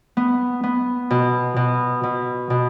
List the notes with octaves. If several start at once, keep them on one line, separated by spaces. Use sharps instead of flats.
B3
B3
B2
B2
B2
B2